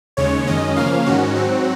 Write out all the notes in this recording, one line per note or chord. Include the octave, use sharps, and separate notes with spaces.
D#2 C#3 G#3 C#5
F#2 D#3 G#3 C#4 D#5
C#3 F3 A#3 C#4 F5
G#2 D#3 G#3 C#4 F#4
G#2 F#3 C4